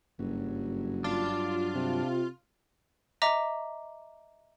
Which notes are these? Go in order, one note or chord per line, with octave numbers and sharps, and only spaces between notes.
F#1 G2 F#3
D4 F4
C3
D#5 E5 A#5 D6